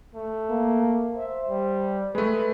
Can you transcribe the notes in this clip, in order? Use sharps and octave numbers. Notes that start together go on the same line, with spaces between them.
A3
A#3
C5 E5
G3
G#3 A3 B4